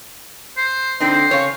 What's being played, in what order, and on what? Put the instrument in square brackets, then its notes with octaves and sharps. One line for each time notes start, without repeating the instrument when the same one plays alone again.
[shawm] C5
[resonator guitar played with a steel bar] D3 C4 D#4 [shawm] C5
[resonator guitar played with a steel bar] C#3 C#5